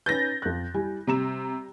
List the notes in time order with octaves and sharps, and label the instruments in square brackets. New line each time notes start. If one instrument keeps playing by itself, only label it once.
[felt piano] C#4 D#4 B4 [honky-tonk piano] G6 A6 A#6
[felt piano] F2 F#6
G3 E4 G#5
[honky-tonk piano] C3 [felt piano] G3 A#5 E7